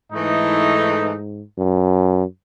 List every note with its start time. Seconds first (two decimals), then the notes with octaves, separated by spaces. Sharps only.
0.12 G#2 E3 A3 D#4
1.58 F#2